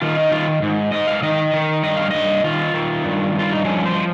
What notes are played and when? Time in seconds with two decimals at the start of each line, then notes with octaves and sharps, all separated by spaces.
0.02 D#3 F4
0.17 D#4
0.32 D#3 F4
0.62 G#2
0.92 G#2 D#5
1.07 F5
1.22 D#3 D#5
1.54 D#3
1.83 G2 D#5
1.97 F5
2.11 G2 D#5
2.44 D#3 F4
2.74 D#3
3.04 G2
3.35 G2 F4
3.52 D#4
3.64 F3 C#4
3.86 C5
3.95 F3